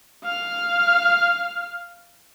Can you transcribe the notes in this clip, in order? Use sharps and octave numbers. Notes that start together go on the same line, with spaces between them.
F5 F6